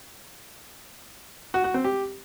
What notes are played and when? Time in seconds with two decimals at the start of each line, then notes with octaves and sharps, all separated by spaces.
1.54 F#4
1.64 F#4
1.74 C4
1.84 G4